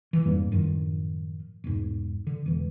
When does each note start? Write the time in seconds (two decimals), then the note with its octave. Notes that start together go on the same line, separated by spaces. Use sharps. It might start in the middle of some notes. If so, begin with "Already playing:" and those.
0.13 E3
0.25 F2 G#2 G3 A#3
0.52 F#2 A2 D#3 F3
1.64 E1 G#2
2.27 D3
2.46 E1 E3